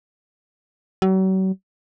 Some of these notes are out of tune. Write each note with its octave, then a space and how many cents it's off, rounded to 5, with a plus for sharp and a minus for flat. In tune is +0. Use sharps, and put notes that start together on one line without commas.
F#3 +40